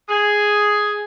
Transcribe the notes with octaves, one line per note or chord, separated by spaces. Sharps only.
G#4